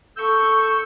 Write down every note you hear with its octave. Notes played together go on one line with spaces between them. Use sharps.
A4 C#6 E6 G6